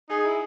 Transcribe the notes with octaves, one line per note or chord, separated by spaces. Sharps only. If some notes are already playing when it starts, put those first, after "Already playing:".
D#4 G#4
E4